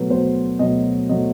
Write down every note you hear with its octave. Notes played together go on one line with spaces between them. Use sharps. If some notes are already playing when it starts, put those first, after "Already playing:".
Already playing: B2 F#3 A3 B4
B2 F#3 A3 C5
B2 F#3 A3 D#5
B2 F#3 A3 D#5